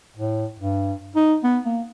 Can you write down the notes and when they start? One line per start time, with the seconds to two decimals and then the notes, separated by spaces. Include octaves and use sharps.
0.16 A2
0.59 G2
1.16 D#4
1.44 B3
1.65 A#3